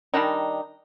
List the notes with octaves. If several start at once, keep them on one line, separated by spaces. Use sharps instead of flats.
D#3 G3 D4 D#4